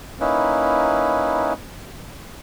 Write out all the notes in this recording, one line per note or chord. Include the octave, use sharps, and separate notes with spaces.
A#3 C#4 D#4 E4 B4